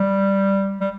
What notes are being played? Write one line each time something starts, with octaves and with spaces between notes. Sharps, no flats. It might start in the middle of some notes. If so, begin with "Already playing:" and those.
Already playing: G3
G3